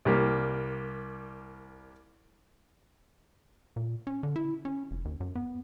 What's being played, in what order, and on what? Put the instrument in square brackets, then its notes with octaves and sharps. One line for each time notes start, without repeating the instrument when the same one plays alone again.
[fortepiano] C2 G3 A#3
[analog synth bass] A#2
C#4
D3
E4
C#4
F1
D#2
F#2
B3